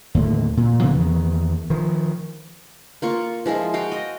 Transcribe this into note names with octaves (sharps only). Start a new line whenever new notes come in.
D#2 A2 D3
A#2
C#3 F3 F#3 B3
E2 D#3
D#3 F3
A#3 F4 C#6
F3 G#3 E4 F4
F#4 F5 G5
D#5